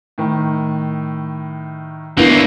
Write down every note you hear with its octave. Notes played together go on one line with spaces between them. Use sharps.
A2 D#3
E3 A#3 B3 D4 E4 F#4 G6